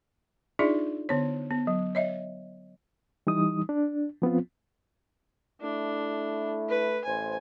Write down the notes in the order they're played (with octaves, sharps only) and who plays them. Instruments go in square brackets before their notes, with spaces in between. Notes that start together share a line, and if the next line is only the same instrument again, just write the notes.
[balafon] D4 D#4 F4 G#4 D5 E5
D3 B3 C#5
B3
F#3
C#5 D#5 E5
[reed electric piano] E3 G3 D#4 D#6
D4
F3 B3 C4 F4
[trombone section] A3 E4 [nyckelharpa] D4
[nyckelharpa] B4
[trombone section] A1 A2 C5 [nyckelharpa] G#5